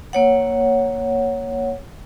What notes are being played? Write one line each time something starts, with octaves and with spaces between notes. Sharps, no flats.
A#3 C#5 F#5